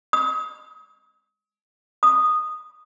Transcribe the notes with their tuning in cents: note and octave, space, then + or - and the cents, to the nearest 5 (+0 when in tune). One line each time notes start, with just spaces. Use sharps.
D#6 +40
D#6 -10